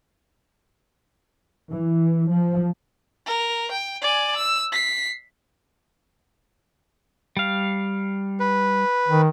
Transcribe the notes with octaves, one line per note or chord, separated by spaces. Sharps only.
E3
F3
A#4
G5
D5 G#5
E6
B6 C7
G3 F5
B4
D#3